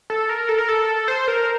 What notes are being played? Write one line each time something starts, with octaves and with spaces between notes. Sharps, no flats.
A4
A#4
A4
A#4
A4
C5
A#4